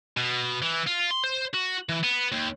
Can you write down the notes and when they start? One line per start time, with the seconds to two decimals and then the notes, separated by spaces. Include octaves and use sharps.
0.17 B2
0.62 E3
0.87 F4
1.11 C6
1.24 C5
1.54 F#4
1.89 E3
2.03 B3
2.32 D#2